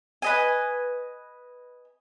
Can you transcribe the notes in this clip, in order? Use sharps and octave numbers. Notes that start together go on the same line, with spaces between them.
B4 D#5 G#5